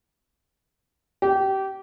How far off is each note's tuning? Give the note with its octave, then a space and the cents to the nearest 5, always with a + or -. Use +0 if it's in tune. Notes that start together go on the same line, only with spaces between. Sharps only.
G4 -25